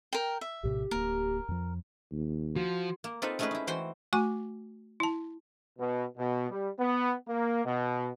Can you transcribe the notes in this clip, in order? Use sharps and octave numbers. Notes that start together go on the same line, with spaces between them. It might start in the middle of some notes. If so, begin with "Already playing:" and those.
A#4 G5
E5
A#1 A2 C3 G4
D1 A#3 A#4
F2 F3
D#2
F3 F#4
A#3
C4 D#4 F4 A4 B4
G#3 A3 C#4 D#4 G#4 B4
D#4 E4
E3 F#4 C5 G5 C6
A3 F#4 G#5 C#6 D6
E4 A5
B2
B2
G3
B3
A#3
B2